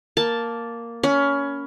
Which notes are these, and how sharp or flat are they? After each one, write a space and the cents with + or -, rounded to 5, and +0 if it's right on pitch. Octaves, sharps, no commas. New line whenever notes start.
A#3 +0 A5 +0
C#4 +20 B5 +0